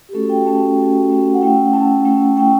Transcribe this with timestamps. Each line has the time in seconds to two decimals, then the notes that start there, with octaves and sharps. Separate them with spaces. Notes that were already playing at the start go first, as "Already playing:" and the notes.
0.09 G4
0.13 A3 C#4 F#4 A4
0.29 G5
0.46 A3 C#4 F#4 A5
0.77 A3 C#4 F#4
1.10 A3 C#4 F#4
1.34 F#5
1.41 A3 C#4 E4 G5
1.73 A3 C#4 E4 A5
2.05 A3 C#4 E4
2.36 A3 C#4 E4 G5